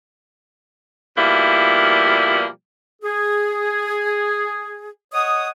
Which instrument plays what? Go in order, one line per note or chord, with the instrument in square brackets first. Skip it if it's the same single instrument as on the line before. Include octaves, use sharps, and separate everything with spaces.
[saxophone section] B2 F3 G3 A#3 E4
[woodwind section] G#4
C#5 D#5 F#5 D#6